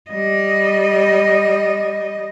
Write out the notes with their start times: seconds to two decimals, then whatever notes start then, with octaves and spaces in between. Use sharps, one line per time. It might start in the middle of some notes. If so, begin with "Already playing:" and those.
0.11 G3 D#5